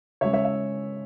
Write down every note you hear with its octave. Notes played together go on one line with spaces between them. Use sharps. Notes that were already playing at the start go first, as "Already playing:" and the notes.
C#3 G#3 C#5 E5
C#5 E5
E5